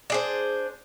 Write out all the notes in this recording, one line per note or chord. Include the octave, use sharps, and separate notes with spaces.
D4 G#4 C5